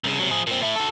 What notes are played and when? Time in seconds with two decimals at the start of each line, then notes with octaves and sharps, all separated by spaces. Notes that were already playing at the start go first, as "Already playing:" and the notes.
0.04 C2 C#3
0.19 C3 F#3
0.31 F3 G#4
0.47 A#2 C4
0.63 A3 E4
0.76 F#4 A4